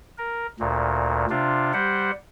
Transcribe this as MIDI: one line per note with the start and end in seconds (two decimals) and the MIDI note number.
0.18 0.47 70
0.60 1.26 38
0.60 1.26 46
1.30 1.73 48
1.30 1.73 62
1.30 1.73 65
1.73 2.11 55
1.73 2.11 67
1.73 2.11 72
1.73 2.11 78